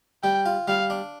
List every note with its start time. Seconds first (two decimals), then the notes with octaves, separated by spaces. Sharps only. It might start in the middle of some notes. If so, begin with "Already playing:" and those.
0.23 G3 G5
0.46 F4
0.68 G3 F5
0.90 D4